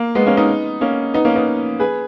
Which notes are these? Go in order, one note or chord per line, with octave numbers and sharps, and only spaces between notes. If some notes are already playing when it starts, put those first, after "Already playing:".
Already playing: A#3
G#3 B3
A#3 C#4
B3 D#4
A#3 C#4
B3 D#4
A#3 C#4
B3 D#4
G#4 B4